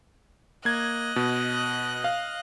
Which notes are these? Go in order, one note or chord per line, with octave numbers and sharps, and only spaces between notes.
A#3 D#5 F#6 G#6
B2
F5